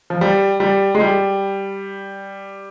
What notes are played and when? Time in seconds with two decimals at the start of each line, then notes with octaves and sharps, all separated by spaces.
0.10 F3
0.21 G3
0.60 G3
0.95 G#3
1.01 G3